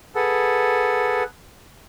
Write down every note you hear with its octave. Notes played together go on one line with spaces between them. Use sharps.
G#4 A4 B4 F#5